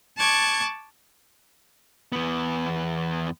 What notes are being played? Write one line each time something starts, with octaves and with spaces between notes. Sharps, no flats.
A5 C#6 D6 F#6 G#6
E2 B3